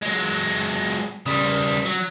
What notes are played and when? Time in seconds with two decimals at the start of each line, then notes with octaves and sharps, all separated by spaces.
0.03 F#3 G#3
1.26 C#3 G3
1.85 F#3